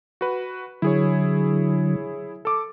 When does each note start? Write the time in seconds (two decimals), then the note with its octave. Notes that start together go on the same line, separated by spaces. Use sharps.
0.21 F#4 B4
0.82 D3 F#3 E4 G#4 C#5
2.45 A4 D6